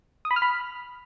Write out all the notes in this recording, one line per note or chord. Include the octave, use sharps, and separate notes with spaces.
D#6
B5
F6
B5